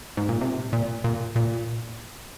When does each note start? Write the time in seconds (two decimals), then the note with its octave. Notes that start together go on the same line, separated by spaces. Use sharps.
0.17 G#2
0.29 A#2
0.41 C3
0.73 A#2
1.04 A#2
1.36 A#2